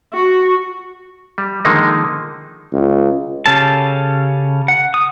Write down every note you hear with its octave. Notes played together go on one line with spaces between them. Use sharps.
F#4
G3
D3 D#3 F3 G#3 A#3 D#4
C#2
C#3 C#4 G4 A4 A5
F#5
D#6